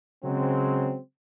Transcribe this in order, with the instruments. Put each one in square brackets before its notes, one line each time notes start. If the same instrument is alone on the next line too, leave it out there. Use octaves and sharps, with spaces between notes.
[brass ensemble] C#3 F#3 G#3 C4